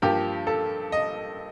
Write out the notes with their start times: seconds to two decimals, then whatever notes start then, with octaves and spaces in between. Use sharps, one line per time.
0.02 G2 F3 A#3 G4
0.47 A4
0.92 D#5